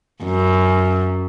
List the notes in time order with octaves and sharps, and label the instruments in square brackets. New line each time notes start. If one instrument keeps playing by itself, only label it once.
[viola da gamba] F#2